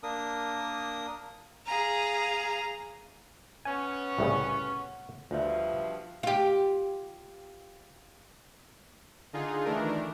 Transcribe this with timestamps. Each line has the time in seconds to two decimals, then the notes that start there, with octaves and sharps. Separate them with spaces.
0.03 A#3 D4 A#4 D#6
1.66 G#4 F5 A#5
3.65 B3 C#4 G#5
4.19 C2 A2 C#3 F#5
5.31 D2 G2 B2 F3 F4 E5
6.23 F4 G4
9.33 D3 D#4 F4 G#4
9.65 D#3 E3 A3 D4 A#4